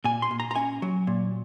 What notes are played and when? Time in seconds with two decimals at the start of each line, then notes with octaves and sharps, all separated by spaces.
0.04 A#2 G#5
0.22 C6
0.31 A#2
0.40 A#5
0.51 A#5
0.56 C#4 G#5
0.82 F#3
1.07 A#2